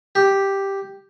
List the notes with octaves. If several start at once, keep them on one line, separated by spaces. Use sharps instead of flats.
G4